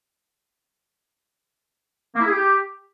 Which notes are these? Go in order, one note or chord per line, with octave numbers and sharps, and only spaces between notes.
A#3
E4
G#4
G4